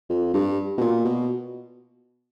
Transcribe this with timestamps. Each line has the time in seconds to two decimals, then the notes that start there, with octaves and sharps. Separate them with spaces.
0.10 F2
0.34 G2
0.78 B2
0.81 A#2
1.05 B2